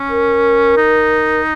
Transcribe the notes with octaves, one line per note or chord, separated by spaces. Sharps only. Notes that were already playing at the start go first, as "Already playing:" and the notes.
Already playing: C#4
A#4
D#4